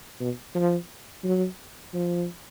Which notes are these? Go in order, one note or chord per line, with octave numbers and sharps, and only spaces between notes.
B2
F3
F#3
F3